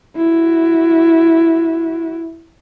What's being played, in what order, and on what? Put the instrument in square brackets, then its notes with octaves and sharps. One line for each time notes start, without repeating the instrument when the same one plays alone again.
[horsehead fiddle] E4 F#4